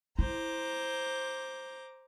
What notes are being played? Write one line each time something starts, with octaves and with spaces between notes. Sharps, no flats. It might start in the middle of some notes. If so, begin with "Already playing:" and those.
E4 C5 A#5 D6